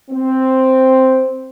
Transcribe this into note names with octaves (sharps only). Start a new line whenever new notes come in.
C4